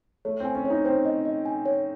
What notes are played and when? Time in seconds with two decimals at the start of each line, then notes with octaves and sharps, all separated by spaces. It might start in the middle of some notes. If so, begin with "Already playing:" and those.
0.25 A3 C#5
0.40 C4 G#5
0.55 C#4
0.65 C#5
0.70 D#4
0.85 C4 C5
1.05 D#5
1.25 D#5
1.45 G#5
1.66 C#5